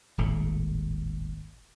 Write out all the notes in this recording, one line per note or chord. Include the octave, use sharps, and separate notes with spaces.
D#1 G#1 A2